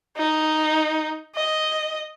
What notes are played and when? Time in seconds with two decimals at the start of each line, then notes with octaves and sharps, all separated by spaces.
0.17 D#4
1.35 D#5